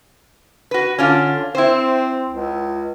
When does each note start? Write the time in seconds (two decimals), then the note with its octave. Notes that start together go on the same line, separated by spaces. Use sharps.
0.71 F#4 B4
0.99 D3 C#4 D4 F4
1.55 C4 E4 C5
2.30 C#2